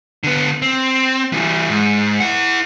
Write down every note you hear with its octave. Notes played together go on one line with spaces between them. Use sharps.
D3 B3
C4
E3 G3
G#2
E4 F#5